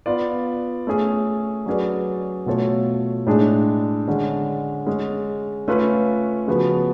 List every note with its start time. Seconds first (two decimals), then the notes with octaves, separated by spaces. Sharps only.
0.06 B3 F4 B4 D5
0.87 A3 C#4 G#4
1.66 F#3 C#4 G#4 B4 D5
2.46 B2 A3 F4 A4 C#5
3.27 A2 G#3 D4 G#4
4.08 D3 G#3 C#4
4.87 G#3 C#4 G#4
5.68 A3 C#4 F4 B4
6.47 C#3 F3 B3 F#4 B4